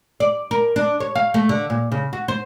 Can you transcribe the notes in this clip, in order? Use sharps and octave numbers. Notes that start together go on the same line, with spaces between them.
D5
A#4
D4
C#5
F5
A3
D3
A#2
C#3
F#4
C5